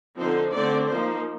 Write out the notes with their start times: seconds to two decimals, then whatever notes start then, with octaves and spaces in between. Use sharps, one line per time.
0.19 D3 F3 C4 D#4 C5
0.53 D3 A3 C4 D5
0.89 F3 A#3 D#4 C5